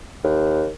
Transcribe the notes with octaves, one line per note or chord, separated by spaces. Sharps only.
D#2